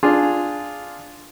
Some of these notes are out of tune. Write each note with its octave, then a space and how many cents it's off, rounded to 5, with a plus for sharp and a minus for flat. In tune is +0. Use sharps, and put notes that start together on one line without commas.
D4 +0 F4 +0 G#4 +0